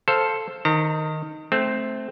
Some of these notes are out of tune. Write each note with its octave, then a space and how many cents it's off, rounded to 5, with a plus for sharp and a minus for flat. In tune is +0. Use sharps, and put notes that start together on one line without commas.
A4 +0 C5 +5 F5 +0
D#3 +0 A#5 -40
A3 -15 C4 +0